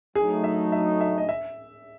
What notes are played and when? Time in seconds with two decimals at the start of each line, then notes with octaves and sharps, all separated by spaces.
0.15 F#3 A3 D#4 G#4
0.44 E5
0.72 E5
1.01 E5
1.18 D#5
1.29 E5